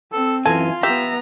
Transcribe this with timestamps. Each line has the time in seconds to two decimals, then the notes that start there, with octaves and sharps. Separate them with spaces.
0.13 C4 A4
0.46 F#2 E3 F4 A4 G#5
0.83 B3 G4 E5 A#5